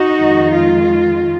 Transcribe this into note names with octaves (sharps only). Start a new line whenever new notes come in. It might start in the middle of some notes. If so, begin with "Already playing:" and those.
Already playing: D#4 F#4
F2 D#3 G#3
F4